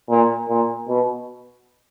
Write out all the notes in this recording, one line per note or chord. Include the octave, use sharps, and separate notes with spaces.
A#2
A#2
B2